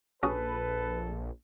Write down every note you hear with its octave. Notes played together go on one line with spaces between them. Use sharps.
A#1 C#4 F#4 G#4 A4 B4